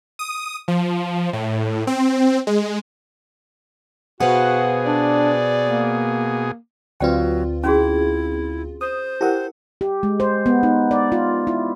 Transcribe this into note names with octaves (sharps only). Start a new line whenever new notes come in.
D#6
F3
A2
C4
G#3
B2 F#4 G#4 B4 C5 F5 F#5
D4 D5
A#3
D2 F#3 C4 F4 B4 D5 G5
C#4 E4 F#4 G#4
C5 D#6
E4 G4 A#4 F#5
G4
G#3
C5
B3
D#4
D5
F4
E4